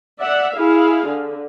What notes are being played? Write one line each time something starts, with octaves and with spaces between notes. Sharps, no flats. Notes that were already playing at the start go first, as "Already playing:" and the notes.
D5 E5 F#5
E4 G#4 F5
D3